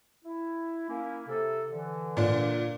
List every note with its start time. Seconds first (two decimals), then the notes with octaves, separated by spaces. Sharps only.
0.24 E4
0.89 A#3 C#4 E4
1.28 C3 A4
1.72 D3 E3
2.17 A#2 D4